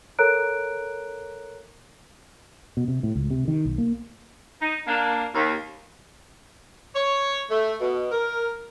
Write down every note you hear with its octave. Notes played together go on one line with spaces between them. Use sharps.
A4 A#4 C#5 A#5 F#6 D7
B2
C3
A2
C#2
C3
D#3
B1
A#3
D#4
A#3 D4
D#2
C#5
A3
B2
A#4